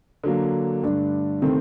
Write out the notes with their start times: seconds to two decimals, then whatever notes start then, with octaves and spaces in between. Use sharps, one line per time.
0.24 D3 F#3 A#3
0.83 G2 D3 A3 D4
1.42 C3 D#3 A3 C4